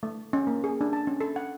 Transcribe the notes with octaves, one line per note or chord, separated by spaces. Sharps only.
A3
C#4
A#3
G#4
D4
A5
C#4
A4
F#5